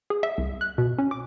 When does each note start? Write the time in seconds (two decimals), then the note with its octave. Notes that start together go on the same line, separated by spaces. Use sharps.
0.10 G#4
0.23 E5
0.38 C2
0.61 F#6
0.78 B2
0.98 C#4
1.11 D6